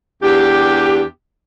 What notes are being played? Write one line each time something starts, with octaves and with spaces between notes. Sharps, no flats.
E2 D4 G4